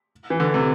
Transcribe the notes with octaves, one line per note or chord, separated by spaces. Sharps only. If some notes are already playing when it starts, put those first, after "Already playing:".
E3
D3
C3